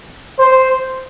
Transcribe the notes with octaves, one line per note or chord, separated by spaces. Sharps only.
C5